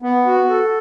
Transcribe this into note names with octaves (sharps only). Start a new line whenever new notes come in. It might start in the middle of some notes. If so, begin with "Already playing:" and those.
B3
F#4
A4